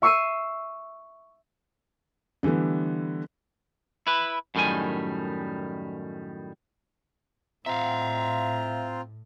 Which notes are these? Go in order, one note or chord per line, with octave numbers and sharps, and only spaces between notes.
E5 C#6 E6 C7 D#7 E7
D3 E3 G3 A3 B3
E4 B4
F#2 A2 D#3 G3 G#5
A2 C4 F4 E5 F5 A#5